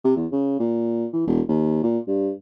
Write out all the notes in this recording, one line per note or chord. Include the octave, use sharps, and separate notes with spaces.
C3
E2
C#3
A#2
E3
E1
D#2
A#2
G2